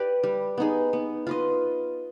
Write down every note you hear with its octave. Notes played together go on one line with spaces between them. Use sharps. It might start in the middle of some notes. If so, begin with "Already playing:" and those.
Already playing: G4 B4 D5
G3
B3 D#4 G#4
B3
F4 B4 D#5